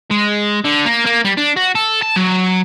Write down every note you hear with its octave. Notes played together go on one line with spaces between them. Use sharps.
G#3
D3
A#3
A#3
G3
D4
F#4
A4
A5
F#3